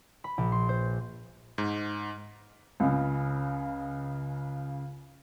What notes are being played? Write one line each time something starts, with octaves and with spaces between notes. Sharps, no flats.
B5
A#1
C6
C5
G#2
C#2 C#3